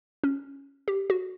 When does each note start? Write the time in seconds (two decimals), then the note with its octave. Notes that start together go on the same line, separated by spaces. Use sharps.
0.24 C#4
0.88 G4
1.10 F#4